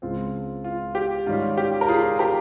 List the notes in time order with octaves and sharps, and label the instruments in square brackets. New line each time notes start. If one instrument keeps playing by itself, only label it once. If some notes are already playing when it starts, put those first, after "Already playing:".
[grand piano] C#2 C#3 G#3 C4 F4
F4
G4
G#2 D#3 G3 C#4 F4
G4
A#4
F4 G#4
G4 A#4